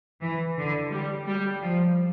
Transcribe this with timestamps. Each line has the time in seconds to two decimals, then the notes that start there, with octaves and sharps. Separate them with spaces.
0.22 E3
0.58 D3
0.92 G3
1.28 G3
1.62 F3